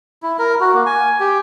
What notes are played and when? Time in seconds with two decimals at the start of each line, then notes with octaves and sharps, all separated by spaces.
0.23 E4
0.39 A#4
0.60 F#4
0.74 A#3
0.86 G#5
1.20 G4